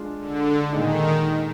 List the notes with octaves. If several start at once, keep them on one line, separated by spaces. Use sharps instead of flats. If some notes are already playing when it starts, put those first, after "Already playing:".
Already playing: G#3 D4 F4
D3
A#2 D#3 G#3 D#4